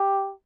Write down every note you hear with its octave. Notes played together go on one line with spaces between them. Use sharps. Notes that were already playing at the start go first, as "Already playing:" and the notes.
Already playing: G4